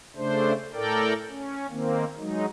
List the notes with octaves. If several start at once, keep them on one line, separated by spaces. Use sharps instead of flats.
C#3 A3 D4 C5
A2 A4 A#4 D5 G5
C#4
D#3 A#3 C4
F#3 G#3 D#4